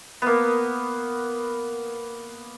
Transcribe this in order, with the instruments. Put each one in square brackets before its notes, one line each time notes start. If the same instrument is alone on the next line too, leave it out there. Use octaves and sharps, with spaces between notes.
[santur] A#3 B3